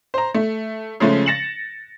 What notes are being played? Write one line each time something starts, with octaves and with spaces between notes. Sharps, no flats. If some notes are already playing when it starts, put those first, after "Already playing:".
C5 A#5
A3
C#3 F3 G#3 A3 C#4
A6 A#6 C#7 E7 F#7